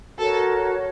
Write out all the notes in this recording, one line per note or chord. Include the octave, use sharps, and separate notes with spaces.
F#4 A4 A#4 C#5